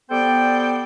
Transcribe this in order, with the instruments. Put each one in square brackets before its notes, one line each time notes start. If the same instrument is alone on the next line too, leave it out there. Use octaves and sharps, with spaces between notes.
[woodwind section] G3 B3 A4 C5 D5 G5